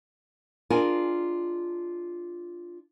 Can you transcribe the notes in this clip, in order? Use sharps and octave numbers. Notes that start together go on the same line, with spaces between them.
D4 F4 G#4 A#4 D#5 G#5